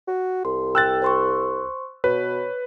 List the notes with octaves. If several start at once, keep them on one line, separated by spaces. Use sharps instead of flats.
F#4
C2 C6
G5 E6 F#6 A6
C5 C6 C#6
B2 B4 C#5